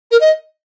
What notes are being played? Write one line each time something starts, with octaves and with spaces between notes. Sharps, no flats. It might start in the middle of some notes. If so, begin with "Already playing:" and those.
A#4
D#5